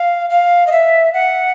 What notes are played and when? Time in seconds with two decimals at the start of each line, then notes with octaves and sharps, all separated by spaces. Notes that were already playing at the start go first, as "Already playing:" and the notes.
Already playing: F5
0.30 F5
0.67 D#5
0.72 E5
1.14 F#5